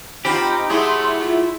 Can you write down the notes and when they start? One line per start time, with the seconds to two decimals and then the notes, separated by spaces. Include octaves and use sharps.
0.25 C4 D#4 F4 G4 G5 A#5 B5
0.70 F#3 A3 E4 G#4 E5 C6
1.21 F4